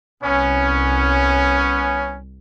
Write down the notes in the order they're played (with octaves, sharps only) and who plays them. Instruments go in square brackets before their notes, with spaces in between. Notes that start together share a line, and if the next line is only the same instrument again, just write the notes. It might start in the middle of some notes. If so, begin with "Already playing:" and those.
[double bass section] C2 [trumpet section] B3 C#4